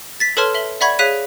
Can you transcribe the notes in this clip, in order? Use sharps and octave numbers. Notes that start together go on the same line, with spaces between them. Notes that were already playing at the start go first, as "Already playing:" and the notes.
A6 B6
A4 B4 C#5 A5 C6 F6
E5 F#7 G7
D5 E5 F#5 B5 C#6 G#6
G#4 C#5 F5 F#6 B6 D#7